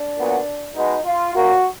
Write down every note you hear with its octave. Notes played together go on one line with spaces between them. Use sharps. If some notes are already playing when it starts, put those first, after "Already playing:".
Already playing: D4
A#2 F#3 B3
B2 G#3 B3 D#4
F4
A#2 F#3 A#3 F#4